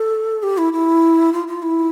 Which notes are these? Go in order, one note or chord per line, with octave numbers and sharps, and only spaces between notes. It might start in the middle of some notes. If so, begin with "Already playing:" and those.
Already playing: A4
G4
E4
E4
F4
F4
E4